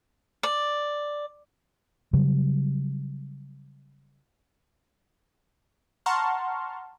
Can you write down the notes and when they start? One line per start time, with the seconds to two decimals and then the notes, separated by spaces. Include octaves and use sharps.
0.43 D5
2.13 C#3 F#3 G3
6.06 F#5 A5 A#5 C6 C#6 F6